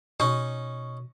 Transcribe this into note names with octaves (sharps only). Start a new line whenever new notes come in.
B2 C#4 D#4 C#6